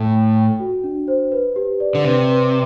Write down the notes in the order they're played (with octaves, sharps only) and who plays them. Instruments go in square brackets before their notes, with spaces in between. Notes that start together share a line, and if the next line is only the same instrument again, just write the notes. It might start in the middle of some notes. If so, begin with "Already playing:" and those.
Already playing: [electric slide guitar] A2 [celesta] G5
[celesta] G5
G5
F#4
D4
C5
B4
G4
D5
[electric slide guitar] D3
[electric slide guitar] C3 [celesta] B4
[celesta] B4